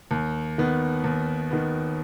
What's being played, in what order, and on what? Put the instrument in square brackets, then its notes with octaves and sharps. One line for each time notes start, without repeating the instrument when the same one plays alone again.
[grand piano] D#2
D#3 B3
D#2
D#3 B3